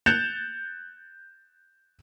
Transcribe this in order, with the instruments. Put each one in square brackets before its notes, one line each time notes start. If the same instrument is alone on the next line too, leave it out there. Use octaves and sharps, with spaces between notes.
[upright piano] F#6 G6 A6 C#7 E7 F7